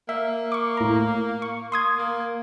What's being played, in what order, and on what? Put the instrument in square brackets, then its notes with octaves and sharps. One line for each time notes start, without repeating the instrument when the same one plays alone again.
[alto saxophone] A#3 [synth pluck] E5
[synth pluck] C#6 D6
A2 A#5
C#6
C6 D#6 G#6
[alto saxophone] A#3